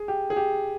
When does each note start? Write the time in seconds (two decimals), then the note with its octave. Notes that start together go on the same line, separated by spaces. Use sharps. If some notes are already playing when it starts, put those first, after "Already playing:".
Already playing: G#4
0.08 G4
0.30 G#4
0.36 G4